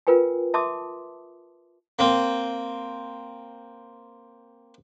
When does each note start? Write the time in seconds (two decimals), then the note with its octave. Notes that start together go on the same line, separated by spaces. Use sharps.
0.07 F4 A#4 B4 G5 G#5
0.54 E5 A5 C6 D6 D#6
1.99 A#3 C4